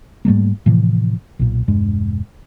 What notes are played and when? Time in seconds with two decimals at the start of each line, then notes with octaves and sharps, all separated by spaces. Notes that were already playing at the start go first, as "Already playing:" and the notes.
0.25 G#2 G3 A3 A#3
0.66 A2 C3 E3 F3
1.39 B1 A#2
1.68 E1 G2 G#3